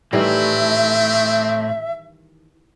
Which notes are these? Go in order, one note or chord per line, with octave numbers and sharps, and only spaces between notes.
A2 D#3 E3 G3 A3 C4 E5